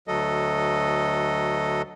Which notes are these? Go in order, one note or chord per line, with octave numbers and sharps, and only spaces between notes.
D2 F#3 A4 D#5